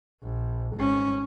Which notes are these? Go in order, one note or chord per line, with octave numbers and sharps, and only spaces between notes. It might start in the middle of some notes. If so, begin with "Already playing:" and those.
A#1
G#1 C#4